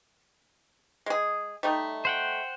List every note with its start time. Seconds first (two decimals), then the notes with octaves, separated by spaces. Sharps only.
1.06 G#3 G#4
1.63 G3 A3 D#4
2.05 C5 F#5 G5